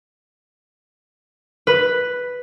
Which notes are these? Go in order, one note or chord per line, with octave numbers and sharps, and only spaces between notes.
B4